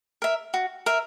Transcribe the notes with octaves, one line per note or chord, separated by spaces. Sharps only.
A#4 E5
F#4
A#4 E5